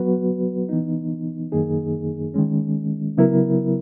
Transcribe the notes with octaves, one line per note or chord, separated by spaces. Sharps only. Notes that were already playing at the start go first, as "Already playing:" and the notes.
Already playing: F#3 B3 F#4 B4
E3 B3 D#4
F#2 D#3 A#3 D#4 G#4
D#3 G#3 C#4
C#3 F#3 B3 E4 A#4